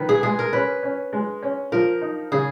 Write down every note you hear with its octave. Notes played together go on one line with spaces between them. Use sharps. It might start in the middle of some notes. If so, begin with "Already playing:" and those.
Already playing: D#3 B4
G#4
G#3 G#4
A#4
C#4 B4
C#4
G#3
C#4
F3 A#4
D#4
C#3 G#4